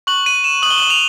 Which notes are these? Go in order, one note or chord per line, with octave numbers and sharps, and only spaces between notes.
C#6 F#6 F#7
D#7
E7
D#6 F#6 F#7 G7
F#7
F7